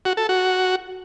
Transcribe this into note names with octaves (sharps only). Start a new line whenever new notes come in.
F#4
A4
F#4